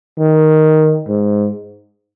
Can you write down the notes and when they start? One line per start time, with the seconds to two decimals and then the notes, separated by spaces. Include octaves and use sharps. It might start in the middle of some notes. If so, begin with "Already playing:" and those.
0.18 D#3
1.08 G#2